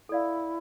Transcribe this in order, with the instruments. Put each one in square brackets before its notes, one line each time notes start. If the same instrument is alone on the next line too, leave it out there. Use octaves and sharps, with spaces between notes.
[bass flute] E4 [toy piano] A4 D5 F5